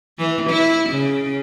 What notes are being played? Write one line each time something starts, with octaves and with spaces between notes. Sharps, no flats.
E3
E4
C#3